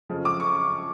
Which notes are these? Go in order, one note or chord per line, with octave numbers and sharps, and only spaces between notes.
F2 C#3 F3
D6
C#6